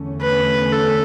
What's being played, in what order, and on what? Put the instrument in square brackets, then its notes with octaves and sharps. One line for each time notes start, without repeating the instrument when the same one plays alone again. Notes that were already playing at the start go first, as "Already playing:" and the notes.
Already playing: [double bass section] E2 D3 A3 C#4
[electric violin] B4
A4